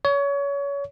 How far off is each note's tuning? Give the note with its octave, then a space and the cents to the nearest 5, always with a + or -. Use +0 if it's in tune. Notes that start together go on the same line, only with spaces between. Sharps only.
C#5 +25